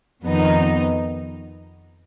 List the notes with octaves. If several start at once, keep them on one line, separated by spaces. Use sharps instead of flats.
F2 D#3 B3 D#4